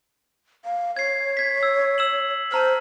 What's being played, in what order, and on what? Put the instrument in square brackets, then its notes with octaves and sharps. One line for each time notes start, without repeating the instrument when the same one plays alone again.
[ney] F5
[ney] C#5 [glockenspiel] G#6 C7
[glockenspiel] G#6 B6
E6
E6 E7 F#7
[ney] C5 [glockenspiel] A5 A#5 F6